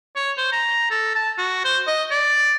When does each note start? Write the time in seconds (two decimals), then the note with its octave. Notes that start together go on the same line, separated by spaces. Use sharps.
0.16 C#5
0.37 C5
0.52 A#5
0.91 A4
1.15 A5
1.38 F#4
1.65 C5
1.87 D#5
2.11 D5